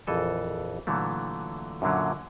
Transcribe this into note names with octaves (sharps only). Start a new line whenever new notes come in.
A#1 F2 E3 A4 G#5
A#2 D3 E3 F#3 A3
F#2 A#2 D3 F#3